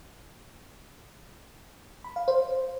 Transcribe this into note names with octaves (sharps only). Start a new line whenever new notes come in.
B5
F5
C5